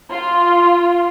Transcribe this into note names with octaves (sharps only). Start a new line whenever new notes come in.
F4